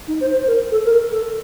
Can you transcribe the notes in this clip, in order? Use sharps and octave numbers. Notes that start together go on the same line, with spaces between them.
D#4
C5
C5
A#4
A4
A#4
A4